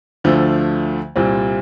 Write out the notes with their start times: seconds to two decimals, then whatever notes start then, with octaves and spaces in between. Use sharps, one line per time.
0.24 D2 D3 F3 A3
1.16 C2 A#2 G3 C4